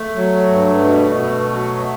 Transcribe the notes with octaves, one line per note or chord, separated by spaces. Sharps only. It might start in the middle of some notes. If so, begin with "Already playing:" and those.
Already playing: A3
F#3
G2
B2
B2
F#3